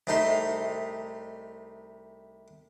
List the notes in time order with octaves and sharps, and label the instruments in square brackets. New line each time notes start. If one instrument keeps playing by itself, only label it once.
[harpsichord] C2 C3 A3 D#4 C6